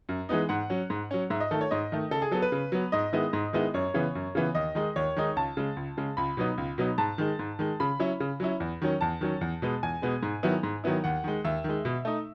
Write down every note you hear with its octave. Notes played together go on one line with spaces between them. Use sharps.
F#2
E3 G#3 B3 D#4
G#2 F#5
F#3 C#4
G#2
F#3 C#4
G#2 E5
D#5
D#3 A3 A4
C#5
G#2 D#5
D#3 A3
C#3 A4
G#4
F#3 B3 A4
B4
C#3
F#3 B3
G#2 D#5
D#3 G#3 B3 E4
G#2
D#3 G#3 B3 E4
F#2 C#5
C#3 E3 B3
F#2
C#3 E3 B3
D#2 D#5
D#3 G#3 D#4
D#2 C#5
D#3 G#3 D#4
C#2 A5
C#3 G#3
C#2
C#3 G#3
C#2 B5
B2 F#3 B3 D#4
C#2
B2 F#3 B3 D#4
G#2 A5
D#3 G#3
G#2
D#3 G#3
C#3 B5
F#3 C#4 E4
C#3
F#3 C#4 E4
E2
D#3 F#3 C#4
E2 A5
D#3 F#3 C#4
E2
B2 G#3 B3
E2 G#5
B2 G#3 B3
G#2
D#3 F#3 B3 E4
G#2
D#3 F#3 B3 E4
D#2 F#5
D#3 G#3
D#2 E5
D#3 G#3
B2
A3 D#4